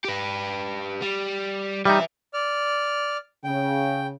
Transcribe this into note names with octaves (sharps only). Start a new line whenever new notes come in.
G4 B4
G3
G3 D#4 B4 E5
D5 F6
C#3 G5